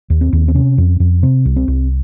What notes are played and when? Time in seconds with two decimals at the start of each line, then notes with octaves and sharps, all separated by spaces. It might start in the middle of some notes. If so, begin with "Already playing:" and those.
0.10 D#2
0.21 C4
0.33 D#2
0.48 C4
0.54 C3 C#4
0.78 F2
1.00 F2
1.23 C3 C4
1.45 C2
1.56 C4
1.68 C2